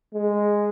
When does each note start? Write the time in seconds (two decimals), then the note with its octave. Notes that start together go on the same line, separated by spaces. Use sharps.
0.14 G#3